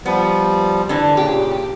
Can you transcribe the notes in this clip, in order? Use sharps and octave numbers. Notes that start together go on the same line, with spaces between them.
F3 G3 B3
D3 E3
A#2 C#3 G4